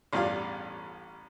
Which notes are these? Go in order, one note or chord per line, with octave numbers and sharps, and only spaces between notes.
A1 E2 G2 F4 D5 F5